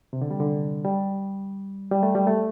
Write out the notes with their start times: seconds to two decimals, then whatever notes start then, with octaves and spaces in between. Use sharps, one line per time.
0.13 C3
0.21 D3
0.31 G3
0.40 D3
0.85 G3
1.91 G3
2.03 A3
2.15 G3
2.27 A3